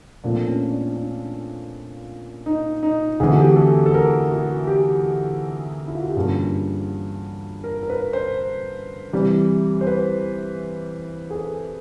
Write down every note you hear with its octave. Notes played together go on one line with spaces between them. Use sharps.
A#2 F3 A3 C4 D4
C#4
D4
D4
D#4
D#4
D2 C3 E3 A3 G#4
F#4
G4
G#4
A4
A4
A#4
F#4
G4
E4
F4
F#4
G4
G2 D3 F3 A#3 C#4 G#4
A#4
A#4
B4
C5
C3 E3 G3
C5
B4
G#4
A4